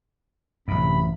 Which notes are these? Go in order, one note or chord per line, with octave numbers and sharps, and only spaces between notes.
A1 F#2 C3 B5